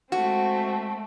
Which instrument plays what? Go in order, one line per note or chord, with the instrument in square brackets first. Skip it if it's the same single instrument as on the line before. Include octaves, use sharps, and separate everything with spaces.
[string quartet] G#3 A3 C4 [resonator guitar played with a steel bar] F#4